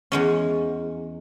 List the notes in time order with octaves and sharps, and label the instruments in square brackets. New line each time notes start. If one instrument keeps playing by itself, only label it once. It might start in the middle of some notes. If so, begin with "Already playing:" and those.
[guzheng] E2 G#3 C#4